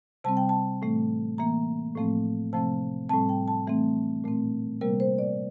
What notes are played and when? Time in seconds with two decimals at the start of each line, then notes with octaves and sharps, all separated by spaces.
0.24 C3 G3 C4 A5
0.37 G5
0.49 A5
0.82 A2 E3 A3 C4
1.38 E3 A#3 A#5
1.96 A2 F3 A3 C4
2.53 C3 F3 A3 C4 A5
3.09 A2 G3 C4 A5
3.29 G5
3.48 A5
3.67 E3 A3 C4
4.24 A#2 A3 C4
4.81 C3 G3 A#3 A#4
5.00 C5
5.19 D5